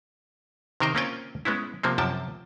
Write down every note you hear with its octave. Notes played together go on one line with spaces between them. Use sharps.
C3 D#3 A#4 C5 D#5 G5
A#3 C4 C#4 F4 G5 G#5
G#3 B3 C#4 E4
C3 F3 A#3 C4
F#2 C3 F3 G5 A5